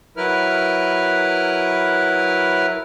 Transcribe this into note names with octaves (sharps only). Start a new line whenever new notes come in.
F#3 E4 A#4 B4 F6